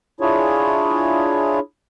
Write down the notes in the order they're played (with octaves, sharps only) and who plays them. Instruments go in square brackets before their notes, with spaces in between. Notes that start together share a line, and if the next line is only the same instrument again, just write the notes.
[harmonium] D4 E4 F4 G#4 C#5